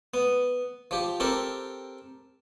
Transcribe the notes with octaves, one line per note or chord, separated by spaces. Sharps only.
B3
F3 G4
C4 G4 A4 A#4